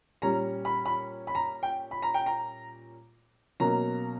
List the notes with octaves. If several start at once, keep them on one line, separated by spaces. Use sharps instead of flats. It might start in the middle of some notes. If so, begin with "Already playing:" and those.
A#2 G3 C#4 A#5
B5
B5
B5
A#5
G5
B5
A#5
G5
A#5
B2 F#3 A#3 C#4 A#5